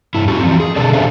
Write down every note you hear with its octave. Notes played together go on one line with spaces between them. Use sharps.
G2 E4
C#4 E4 F#4 G4
E3 F3 C4
G#4
B2 D3 A4 A#4 D5
C#4 D4 G4 C5 E5 F5